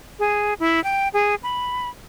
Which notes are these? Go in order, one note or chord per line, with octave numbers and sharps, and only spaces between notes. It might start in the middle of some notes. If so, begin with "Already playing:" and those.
G#4
E4
G5
G#4
B5